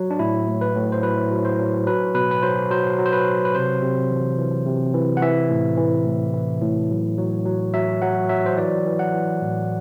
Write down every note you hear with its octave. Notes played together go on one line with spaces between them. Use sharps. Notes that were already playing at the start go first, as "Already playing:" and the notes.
Already playing: F#3
D4
A2 E4
A2
B4
A2
C5
F#3 B4
F#3
C5
F#3
F#3 B4
B2 B4
B4
F#3 C5
F#3 C5
F#3
C5
B4
F#3
B4
C3 C5
C3
E3
E3
C3
E3
F#5
E3 E5
A2
E3
A2
E3
A2
F#3
F#3
F#3
F#3 E5
F#3 F#5
F#3 E5
C5
E3 D5
E3
F#5
E3
A2